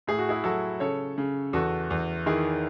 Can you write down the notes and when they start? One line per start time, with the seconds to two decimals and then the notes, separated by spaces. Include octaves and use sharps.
0.07 A2 G#4
0.18 F#4
0.29 E4 G#4
0.44 F#3 F#4 A4
0.80 C#3 A4 C#5
1.18 C#3
1.53 E2 F#4 A4
1.90 E2
2.26 D#3 E4 G#4